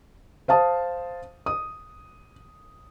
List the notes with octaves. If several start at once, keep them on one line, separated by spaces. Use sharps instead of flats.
C5 F5 A5 D#6
D#6